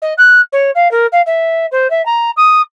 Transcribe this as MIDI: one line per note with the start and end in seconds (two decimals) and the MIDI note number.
0.02 0.14 75
0.18 0.41 90
0.52 0.71 73
0.75 0.91 77
0.91 1.06 70
1.12 1.22 77
1.26 1.66 76
1.71 1.90 72
1.90 2.04 76
2.05 2.31 82
2.36 2.61 87